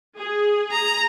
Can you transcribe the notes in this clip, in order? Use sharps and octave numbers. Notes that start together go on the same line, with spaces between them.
G#4
A#5